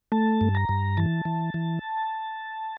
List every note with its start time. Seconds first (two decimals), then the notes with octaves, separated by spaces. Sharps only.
0.12 A3 A5
0.41 G2
0.55 A#5
0.69 G2
0.97 E3 A5
1.25 E3
1.54 E3